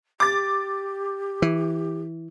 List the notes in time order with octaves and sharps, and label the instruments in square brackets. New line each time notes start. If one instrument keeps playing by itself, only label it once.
[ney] G4 [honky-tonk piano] D6 A6
[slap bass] E3